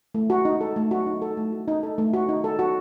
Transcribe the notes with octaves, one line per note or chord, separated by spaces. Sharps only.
A3
F#4
D#4
A4
A3
F#4
D#4
A4
A3
F#4
D#4
A4
A3
F#4
D#4
A4
F#4